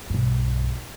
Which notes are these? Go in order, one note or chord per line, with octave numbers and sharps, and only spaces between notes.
B1 G2